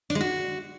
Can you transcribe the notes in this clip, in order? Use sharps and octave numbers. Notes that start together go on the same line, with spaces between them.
D4
G#3
F#4